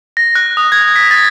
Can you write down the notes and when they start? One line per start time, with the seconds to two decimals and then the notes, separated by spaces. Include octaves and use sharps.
0.17 A#6
0.35 F#6
0.57 D#6
0.72 G#6
0.96 B6
1.11 A6